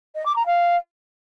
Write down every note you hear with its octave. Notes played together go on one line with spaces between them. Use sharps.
D#5
D6
A#5
F5